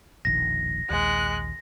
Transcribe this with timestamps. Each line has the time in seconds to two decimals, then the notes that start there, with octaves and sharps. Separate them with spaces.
0.25 E1 A#1 D#3 A#6
0.90 A#1 D#2 G#3 F#6